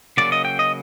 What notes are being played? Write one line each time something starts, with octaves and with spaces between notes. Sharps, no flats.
C#3 F#3 A#3 D5
D#5
G5
D#5